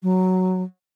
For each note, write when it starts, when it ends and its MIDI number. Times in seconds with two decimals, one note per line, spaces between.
0.03 0.62 54